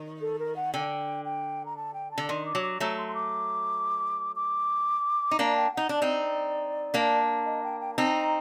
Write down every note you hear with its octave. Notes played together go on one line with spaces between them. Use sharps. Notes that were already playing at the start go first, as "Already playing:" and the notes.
Already playing: D#3
A4
A#4
F#5
D3 G5
G5
A#5
A5
G5
A5
D3
D#3 C6
D6
F#3
D6
F#3 A3 A#5
C6
C6
D6
D6
D#4
A#3 D4 A#5
G5
D#4 F#5
D4 D5
C4 D#4
A#3 D4
D#5
G5
G5
A#5
C4 D#4 A5
A#5